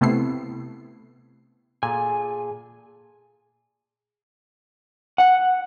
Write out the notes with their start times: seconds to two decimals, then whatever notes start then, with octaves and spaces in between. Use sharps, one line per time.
0.01 C3 A3 B3 C4 E4 C7
1.83 A#2 G#4 A4 G#5
5.18 F#5